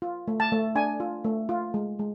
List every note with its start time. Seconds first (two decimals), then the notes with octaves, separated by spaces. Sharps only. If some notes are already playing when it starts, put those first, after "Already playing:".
0.02 F4
0.28 A3
0.40 A5
0.52 A3
0.75 D4 G#5
1.00 F4
1.24 A3
1.49 F4
1.74 G#3
1.99 G#3